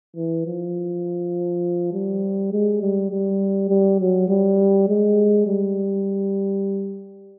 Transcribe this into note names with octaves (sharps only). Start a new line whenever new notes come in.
E3
F3
G3
G#3
G3
G3
G3
F#3
G3
G#3
G3